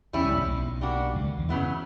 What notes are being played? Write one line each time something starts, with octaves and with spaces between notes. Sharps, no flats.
E2 G3 C#4 E4
C#2 C#3
A#1 A#2
B1 B2
G3 A#3 D4 F#4
C#2 C#3
D2 D3
E2 E3
F#2 C#3 F#3 B3 E4